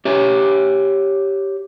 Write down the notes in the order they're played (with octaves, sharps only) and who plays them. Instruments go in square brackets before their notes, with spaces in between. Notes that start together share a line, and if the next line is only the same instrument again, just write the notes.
[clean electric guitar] G4 C#5 E5